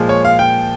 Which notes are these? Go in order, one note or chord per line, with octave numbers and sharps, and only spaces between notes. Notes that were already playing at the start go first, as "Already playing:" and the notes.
Already playing: A#2 F3 G#3
C#5
F5
G5